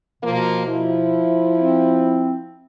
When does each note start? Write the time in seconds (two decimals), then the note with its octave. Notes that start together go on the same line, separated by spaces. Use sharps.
0.22 B2 F3 A#3
0.67 F3 E4
1.56 C4